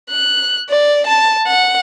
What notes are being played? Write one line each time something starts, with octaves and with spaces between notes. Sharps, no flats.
F#6
D5
A5
F#5